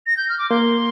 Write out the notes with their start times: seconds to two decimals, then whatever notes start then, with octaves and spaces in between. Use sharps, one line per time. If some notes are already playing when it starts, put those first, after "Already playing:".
0.07 A#6
0.17 G6
0.29 F6
0.39 D6
0.50 A#3 C6